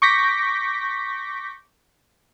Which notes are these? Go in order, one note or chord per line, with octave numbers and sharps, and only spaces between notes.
C#6 D6 G6 A#6 B6